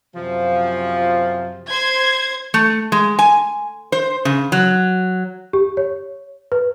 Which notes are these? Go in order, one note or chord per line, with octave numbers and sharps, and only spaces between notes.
F#2 C3 F3
C5 G#6
A3
G#3
G#5
C5
C#3
F#3
G4
C#5
B4